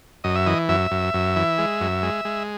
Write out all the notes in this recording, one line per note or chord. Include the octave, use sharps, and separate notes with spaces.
F#2 D#5
E5
E3 D#5
F#2 E5
F#2
F#2
E3
G#3
F#2
G#3
G#3